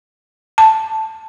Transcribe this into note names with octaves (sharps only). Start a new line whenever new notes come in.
A5